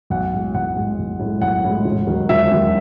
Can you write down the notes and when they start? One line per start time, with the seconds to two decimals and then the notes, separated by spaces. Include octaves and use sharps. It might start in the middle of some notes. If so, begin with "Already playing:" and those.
0.10 B1 F#5
0.33 A2 G#3
0.54 B1 F#5
0.76 A2 G#3
0.98 B1
1.19 A2 G#3
1.41 B1 F#5
1.64 A2 G#3
1.85 E1
2.07 D#2 D#3 F#3
2.29 E1 E5
2.51 D#2 D#3 F#3